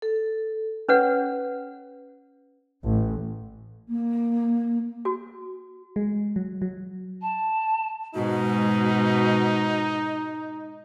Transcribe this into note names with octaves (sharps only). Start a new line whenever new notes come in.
A4
C#4 B4 C#5 F#5
A1
A#3
F#4
G#3
F#3
F#3
A5
G#2 B2 G#3 D#4 F#4